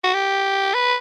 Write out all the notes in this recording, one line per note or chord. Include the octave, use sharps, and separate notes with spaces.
F#4
G4
B4